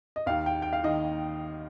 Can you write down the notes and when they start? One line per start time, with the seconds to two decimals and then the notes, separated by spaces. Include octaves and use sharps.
0.16 D#5
0.26 D#2 D#3 F5
0.46 G5
0.62 G5
0.73 F5
0.84 D#3 D#5